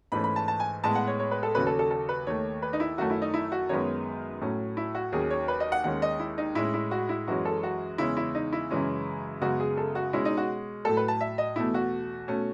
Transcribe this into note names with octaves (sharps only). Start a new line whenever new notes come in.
G#2 E3 A3 C#4 B5
B5
A5
A5
G#5
A2 G#3 B3 A5
F#5
C#5
C#5
B4
A4
D#2 C#3 F#3 C#4 B4
A4
A4
A4
B4
D#2 D#3 A3 C#5
B4
D#4
E4
F#2 D#3 A3 C#4 F#4
E4
D#4
E4
F#4
F#2 D#3 G#3 B3 C#5
A2 F#3 A3 C#4
E4
F#4
D#2 D#3 F#3 C#4 G#4
C#5
B4
D#5
F#5
D#2 D#3 G#3 C#4 F#5
D#5
E4
D#4
A2 G#3 C#4 E4
E4
F#4
E4
F#2 E3 G#3 C#4 F#4
A4
F#4
E2 C#3 G#3 C#4 E4
E4
D#4
E4
F#2 C#3 E3 G#3 C#4
F#2 C#3 G#3 B3 F#4
G#4
A4
F#4
B2 G#3 C#4 E4
D#4
F#4
A2 F#3 A3 A4
B4
A5
E5
D#5
E2 B2 A3 E4
F#4
B2 A3 C#4